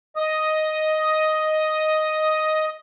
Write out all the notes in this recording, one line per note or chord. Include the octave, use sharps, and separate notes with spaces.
D#5 D#6